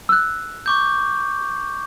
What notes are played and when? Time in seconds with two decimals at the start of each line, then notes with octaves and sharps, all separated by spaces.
0.09 E6 F#6
0.66 C#6 D6 G6